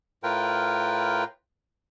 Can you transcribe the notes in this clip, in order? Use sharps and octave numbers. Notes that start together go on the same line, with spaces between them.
A2 F4 A#4 B4 G5